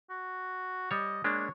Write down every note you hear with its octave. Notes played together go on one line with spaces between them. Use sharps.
F#4
G3 C#5 D#5
G#3 A#3 D4 C#5